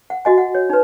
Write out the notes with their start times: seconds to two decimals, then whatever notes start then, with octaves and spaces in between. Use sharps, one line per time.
0.10 F#5
0.25 F#4 D#5 G#5
0.38 F#5
0.55 C#5
0.70 D#4 B4